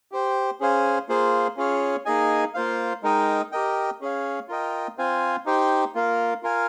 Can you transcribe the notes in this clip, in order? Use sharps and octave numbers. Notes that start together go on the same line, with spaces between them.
G4 C5 G5
C#4 G#4 C5 F5 G#5
A#3 F4 G#4 C5
C#4 F4 G#4 C#5 F5
A#3 D#4 G#4 D#5 G#5
A#3 F4 C5 F5
G#3 D#4 A#4 D#5 G5
G4 A#4 D#5 G5
C#4 G#4 C#5 F5
F4 A#4 D#5 G5
C4 F4 C5 F5 G#5
D#4 G4 C5 G5
A#3 F4 A#4 F5
F4 A#4 F5 G#5